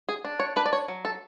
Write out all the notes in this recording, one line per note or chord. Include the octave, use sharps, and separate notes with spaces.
G#4
D4
C#5
D4 B4
D5
C#5
F#3
A4